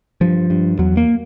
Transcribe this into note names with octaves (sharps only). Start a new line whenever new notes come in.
G2 F3
G2
E2 F#3
A#3